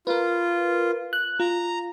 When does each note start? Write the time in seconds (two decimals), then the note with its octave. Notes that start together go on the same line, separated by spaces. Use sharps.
0.07 F4 A#4 B4
1.13 F#6
1.40 F4 A#5